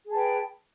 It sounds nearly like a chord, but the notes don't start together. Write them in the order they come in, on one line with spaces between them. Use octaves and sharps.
G#4 A5 B4 G5